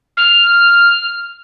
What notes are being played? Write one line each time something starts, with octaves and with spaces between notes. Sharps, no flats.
F6